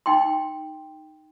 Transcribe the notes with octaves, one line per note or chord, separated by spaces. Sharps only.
D#4 G5 C6